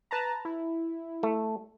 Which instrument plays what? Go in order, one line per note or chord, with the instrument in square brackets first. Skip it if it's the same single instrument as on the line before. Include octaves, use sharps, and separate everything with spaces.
[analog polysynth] B4 A5 A#5
E4
[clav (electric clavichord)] A3